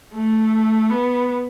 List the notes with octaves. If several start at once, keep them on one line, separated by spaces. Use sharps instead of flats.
A3
B3